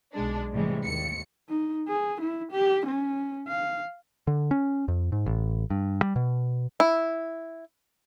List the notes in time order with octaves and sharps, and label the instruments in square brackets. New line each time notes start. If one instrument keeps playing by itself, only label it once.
[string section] B1 G#3 D4
A2 C3 E3 G3 G#3
D#2 C#7
[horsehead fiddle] D#4
G#4
E4
G4
C#4
F5
[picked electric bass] D3
C#4
F2
G#2
A1
G2
G3
B2
[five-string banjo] E4